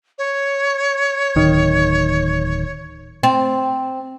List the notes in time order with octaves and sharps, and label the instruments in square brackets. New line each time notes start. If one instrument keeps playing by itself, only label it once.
[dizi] C#5
[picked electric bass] D1 D#3
[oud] C4